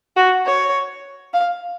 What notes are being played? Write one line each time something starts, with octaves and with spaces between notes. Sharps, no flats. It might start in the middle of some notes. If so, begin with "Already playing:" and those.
F#4
C#5
F5